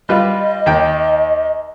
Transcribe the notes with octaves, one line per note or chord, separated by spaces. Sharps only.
G3 F4 B4 D#5
D#2 G5